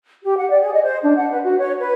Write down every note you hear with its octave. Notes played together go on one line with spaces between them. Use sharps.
G4
F#5
D5
G#4
D#5
C5
D4
F#5
B4
F#4
C#5
B4